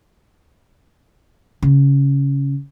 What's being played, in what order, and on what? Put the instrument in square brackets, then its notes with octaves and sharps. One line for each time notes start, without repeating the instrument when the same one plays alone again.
[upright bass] C#3